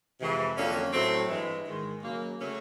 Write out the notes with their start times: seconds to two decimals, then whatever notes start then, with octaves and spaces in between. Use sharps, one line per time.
0.19 F2 C3 E3 G#3
0.56 F2 D3 F#3 A#3 C#4
0.92 A2 F#3 A3 C4
1.29 G2 E3 G#3
1.66 G#2 D#3 G#3
2.03 C#3 F#3 A#3
2.40 C#3 F#3 A3 C#4